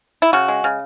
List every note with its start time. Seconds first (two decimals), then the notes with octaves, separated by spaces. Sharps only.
0.22 E4
0.33 C#3 F#4
0.48 G#3
0.64 C#3